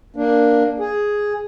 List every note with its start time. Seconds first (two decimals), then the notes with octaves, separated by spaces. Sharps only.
0.16 A#3 D4
0.79 G#4